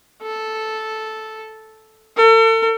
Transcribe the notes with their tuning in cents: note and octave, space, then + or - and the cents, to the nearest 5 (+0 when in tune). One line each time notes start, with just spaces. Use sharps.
A4 -5
A4 +40